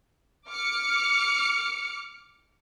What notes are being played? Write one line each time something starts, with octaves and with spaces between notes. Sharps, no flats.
D6 F6 C#7